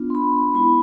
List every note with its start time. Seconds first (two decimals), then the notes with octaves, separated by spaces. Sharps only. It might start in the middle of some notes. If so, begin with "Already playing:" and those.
Already playing: B3 D4 F4
0.10 C6
0.15 B5
0.54 G#3 B3 E4 B5